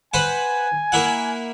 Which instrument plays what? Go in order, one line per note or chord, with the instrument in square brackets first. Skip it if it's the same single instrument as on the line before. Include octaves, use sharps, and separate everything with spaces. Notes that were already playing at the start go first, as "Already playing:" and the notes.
[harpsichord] B4 C5 F#5 [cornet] G#5
[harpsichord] A#3 E4 F#5